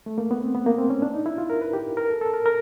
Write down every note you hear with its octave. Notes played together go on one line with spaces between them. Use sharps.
A3
A#3
B3
C4
B3
A#3
C4
C#4
D4
D#4
E4
F4
A#4
B4
G4
A#4
A4
A4
A#4
A#4